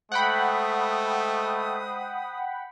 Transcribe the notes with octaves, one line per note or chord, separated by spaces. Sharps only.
G#3 A3 C5 F#5 G5 B5 D#6